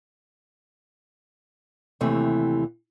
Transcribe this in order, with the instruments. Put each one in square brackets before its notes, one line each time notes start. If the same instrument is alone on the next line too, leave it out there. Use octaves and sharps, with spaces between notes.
[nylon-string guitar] D#2 C3 E3 A3